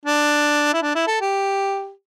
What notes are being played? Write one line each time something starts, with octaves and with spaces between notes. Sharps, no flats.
D4
E4
D4
E4
A4
G4